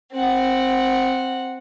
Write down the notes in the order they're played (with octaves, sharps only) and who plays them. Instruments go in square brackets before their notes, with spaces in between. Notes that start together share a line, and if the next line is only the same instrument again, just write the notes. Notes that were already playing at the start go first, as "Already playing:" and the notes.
[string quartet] C4 F#5